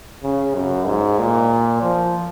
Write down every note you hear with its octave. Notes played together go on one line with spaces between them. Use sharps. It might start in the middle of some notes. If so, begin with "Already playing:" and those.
C#3
F#2
G#2
A#2
F3